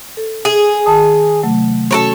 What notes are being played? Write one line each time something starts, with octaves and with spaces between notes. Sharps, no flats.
A4
G#4
D#3 A5 D#6
C3 F#3 A3
C#4 F#4 A4 A#4 C#5